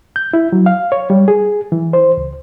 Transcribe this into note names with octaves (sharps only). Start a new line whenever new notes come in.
G6
E4
F#3
F5
C#5
G3
G#4
E3
C5
C#2